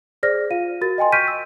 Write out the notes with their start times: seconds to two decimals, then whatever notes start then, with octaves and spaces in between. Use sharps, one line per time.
0.23 G#4 C5 D5 F6 A#6
0.50 F4 F5 D#7
0.81 F#4 A#4 A6
0.98 D#5 G5 G#5 C6
1.12 C#6 F6 G6 B6 D7 D#7
1.28 E6